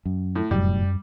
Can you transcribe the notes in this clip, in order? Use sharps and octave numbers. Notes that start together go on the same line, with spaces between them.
F#2
A2
F1 F#2 A2 F#3 G3